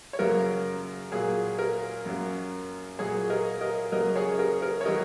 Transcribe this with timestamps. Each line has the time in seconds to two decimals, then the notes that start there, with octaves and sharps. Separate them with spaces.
0.13 C#5
0.19 F#2 C#3 F#3 A#3 A#4
1.12 A#2 F#3 A#3 G#4
1.59 A#4
2.06 F#2 F#3 A#3
2.99 A#2 F#3 A#3 G#4 C#5
3.30 A#4 D#5
3.61 A#4 D#5
3.92 F#2 C#3 F#3 A#3 A#4 D#5
4.16 G#4 C#5
4.39 A#4
4.62 A#4
4.81 C#5
4.85 D#3 F#3 A#4 D#5